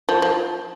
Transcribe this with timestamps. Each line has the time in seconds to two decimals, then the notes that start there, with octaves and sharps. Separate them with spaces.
0.09 F3
0.22 F3